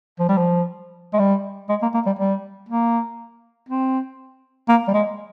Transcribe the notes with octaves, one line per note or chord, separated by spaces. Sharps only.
F3
G3
F3
G#3
G3
G#3
A#3
A#3
G3
G3
A#3
C4
A#3
G3
G#3